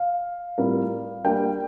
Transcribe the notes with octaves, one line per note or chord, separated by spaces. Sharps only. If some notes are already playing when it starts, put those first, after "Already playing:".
Already playing: F5
A2 G3 C4 F4 A#4
G3 A#3 D4 G5